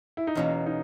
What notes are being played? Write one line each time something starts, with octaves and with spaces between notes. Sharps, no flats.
E4
D#4
E2 B2 A#3 C#4
D#4